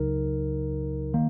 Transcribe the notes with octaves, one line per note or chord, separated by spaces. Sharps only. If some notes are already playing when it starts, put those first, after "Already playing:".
Already playing: C#2 C#3 F#3 D#4 A#4
D#3 A#3